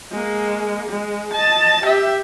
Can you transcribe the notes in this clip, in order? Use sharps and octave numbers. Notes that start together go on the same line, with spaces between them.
G#3 A#3
G#3
D#5 A5
G4 E5